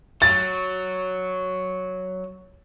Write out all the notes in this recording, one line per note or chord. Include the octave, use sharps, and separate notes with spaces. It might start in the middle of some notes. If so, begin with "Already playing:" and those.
F#3 A6